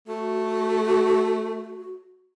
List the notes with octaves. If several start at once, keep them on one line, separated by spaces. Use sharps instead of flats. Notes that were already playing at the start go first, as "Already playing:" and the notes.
A3 F#4